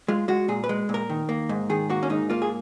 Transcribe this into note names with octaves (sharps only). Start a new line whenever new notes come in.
G#3 F4
G#3 F#4
A#2 G#4
B4
G#3
A#2
A#4
D#3
A#3
G#2
D#3 G#4
A#3 F#4
C#4
G#2 D#4
A#3 F4
G#4